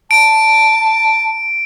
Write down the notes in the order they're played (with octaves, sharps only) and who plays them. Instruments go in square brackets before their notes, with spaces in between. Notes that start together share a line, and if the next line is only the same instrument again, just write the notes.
[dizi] A5 [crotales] D7